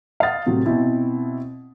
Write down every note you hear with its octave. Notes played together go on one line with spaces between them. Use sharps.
F5 F#5 D#6 A6
A2 C3 F#3 A3
B2 C4 E4